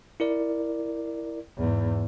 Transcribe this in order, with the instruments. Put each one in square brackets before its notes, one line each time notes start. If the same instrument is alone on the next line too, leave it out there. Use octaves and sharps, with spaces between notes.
[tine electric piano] E4 A#4 D5
[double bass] E2 G#2